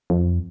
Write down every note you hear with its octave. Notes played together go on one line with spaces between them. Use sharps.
F2